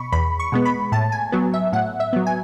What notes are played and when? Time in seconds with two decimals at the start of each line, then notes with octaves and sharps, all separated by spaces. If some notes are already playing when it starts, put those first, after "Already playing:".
Already playing: B2 B5 C#6
0.12 E2 B5
0.39 C#6
0.52 B2 G#3 B3
0.65 B5
0.92 A2 A5
1.12 G#5
1.32 F#3 B3
1.54 E5
1.73 A2 F#5
2.00 E5
2.13 F#3 B3
2.27 G#5